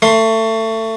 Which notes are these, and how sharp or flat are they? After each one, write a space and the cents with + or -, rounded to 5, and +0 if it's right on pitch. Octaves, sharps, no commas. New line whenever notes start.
A3 +25 C6 +20